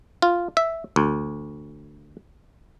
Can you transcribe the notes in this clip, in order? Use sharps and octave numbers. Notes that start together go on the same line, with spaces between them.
F4
E5
D2